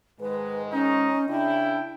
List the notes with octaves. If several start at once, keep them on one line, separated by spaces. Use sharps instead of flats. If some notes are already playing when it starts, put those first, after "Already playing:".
G#2 D#3 G#3 B4
C#4 D#4
C#3 D4 E4 G5